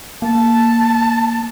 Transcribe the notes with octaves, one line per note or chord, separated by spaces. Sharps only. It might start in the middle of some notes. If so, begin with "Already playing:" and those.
A#3 A5